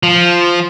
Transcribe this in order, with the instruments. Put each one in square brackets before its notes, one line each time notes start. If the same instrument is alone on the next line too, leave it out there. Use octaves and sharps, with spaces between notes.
[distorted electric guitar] F3